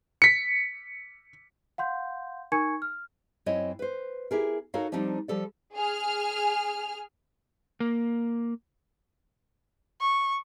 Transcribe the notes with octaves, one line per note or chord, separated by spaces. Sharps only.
B6 C#7
F5 F#5 C6 G6
D#4 A#4 G#5 C#6 G#6 C#7
F6
F#2 C4 E4 C#5 D#5
B4 C5
E4 G4 G#4 A#4
D#4 F#4 A4 A#4 C#5 F5
F3 G3 C4 D4 D#4
F3 G3 A4 D5
G#4 F6
A#3
C#6